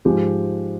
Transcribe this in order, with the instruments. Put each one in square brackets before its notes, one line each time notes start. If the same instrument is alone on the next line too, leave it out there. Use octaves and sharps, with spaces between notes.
[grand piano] G#2 F3 G#3 G4